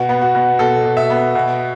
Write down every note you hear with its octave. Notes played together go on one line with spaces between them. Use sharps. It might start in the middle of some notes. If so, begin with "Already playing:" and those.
Already playing: B2 F#4
B3
F#4
B2
B2 A4
B2
E5
B3
B2